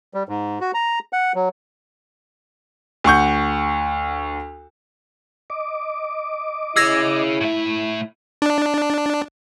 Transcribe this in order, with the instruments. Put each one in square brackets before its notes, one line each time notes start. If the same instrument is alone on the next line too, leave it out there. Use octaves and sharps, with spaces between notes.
[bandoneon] G3
G#2
F#4
A#5
F#5
F#3
[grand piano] D2 F#5 C#6 G6
[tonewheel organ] D#5 D6
[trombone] E4 [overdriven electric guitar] G#4 C#5 [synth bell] E6 G#6 A#6
[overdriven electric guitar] A2 E5
[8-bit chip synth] D4